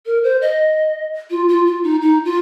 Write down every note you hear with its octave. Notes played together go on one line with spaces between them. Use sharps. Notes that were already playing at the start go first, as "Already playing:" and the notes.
A#4
C5
D#5
F4
F4
F4
D#4
D#4
F4